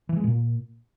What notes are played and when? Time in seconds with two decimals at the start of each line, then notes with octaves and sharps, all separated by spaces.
0.09 E3
0.16 G#3
0.24 A#2